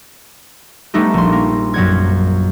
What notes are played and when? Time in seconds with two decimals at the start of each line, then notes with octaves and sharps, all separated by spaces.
0.94 G3 A3 B3 D#4 G4
1.14 A#1 C6
1.32 A#3
1.74 F#2 F#3 D5 F#5 G#6